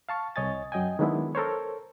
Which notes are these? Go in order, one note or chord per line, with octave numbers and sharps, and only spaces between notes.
F5 A5 C#6
C2 C#5 D#5 G#5 A6
F#2 F#3 D#5 G5 G#5
D#3 F#3 G#3 B3 D4 E4
A4 A#4 C5 C#5